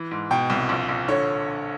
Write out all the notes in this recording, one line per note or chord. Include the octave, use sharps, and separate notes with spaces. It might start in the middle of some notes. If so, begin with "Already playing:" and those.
Already playing: E3
G#2
B2 G5
C2
A#1
A#1
D3 C#5